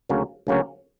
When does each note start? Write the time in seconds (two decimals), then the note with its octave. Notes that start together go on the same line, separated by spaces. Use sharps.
0.09 D2 C#3 F#3 A#3 C#4
0.47 D2 C#3 F#3 A#3 C#4